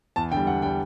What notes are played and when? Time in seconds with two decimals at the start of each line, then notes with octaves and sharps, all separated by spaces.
0.16 E2 A5
0.31 D3 G5
0.37 G3
0.47 E2 F#5
0.62 D3 G5
0.65 G3